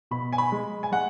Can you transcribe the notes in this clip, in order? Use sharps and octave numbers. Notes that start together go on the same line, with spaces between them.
B2 B5
G#5
B5
G#3
G#5
G#3 F#5